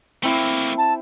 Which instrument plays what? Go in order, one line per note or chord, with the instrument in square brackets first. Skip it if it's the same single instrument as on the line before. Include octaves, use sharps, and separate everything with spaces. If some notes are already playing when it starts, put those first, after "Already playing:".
[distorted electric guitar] A3 A#3 [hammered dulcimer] C4 E4
[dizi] A5